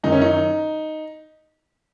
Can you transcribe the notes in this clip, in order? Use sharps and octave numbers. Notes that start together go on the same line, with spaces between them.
F#2 D#3 D#4
C#4
D#4